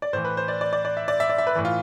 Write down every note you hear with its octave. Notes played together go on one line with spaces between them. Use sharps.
D5
A2 E3 C5
B4
C5
D5
D5
D5
D5
E5
D5
E5
D5
E5
B4
A2 E3
F4